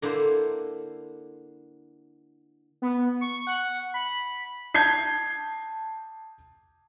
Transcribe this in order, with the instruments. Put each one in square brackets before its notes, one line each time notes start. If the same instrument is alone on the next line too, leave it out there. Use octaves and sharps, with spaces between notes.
[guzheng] D3 A#3 E4 C5
[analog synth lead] B3
C#6
F#5
B5
[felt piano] A5 G6 G#6 C7